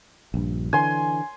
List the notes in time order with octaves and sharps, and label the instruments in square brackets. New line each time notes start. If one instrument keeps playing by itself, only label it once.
[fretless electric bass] A#1 G2
[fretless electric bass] D3 E3 [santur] G#5 C6